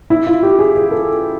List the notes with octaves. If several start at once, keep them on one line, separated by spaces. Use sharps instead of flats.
E4
F4
G4
G#4
G#4
A4